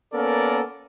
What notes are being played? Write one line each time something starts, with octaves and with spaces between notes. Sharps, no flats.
A#3 B3 C#4 A4 A#4 D5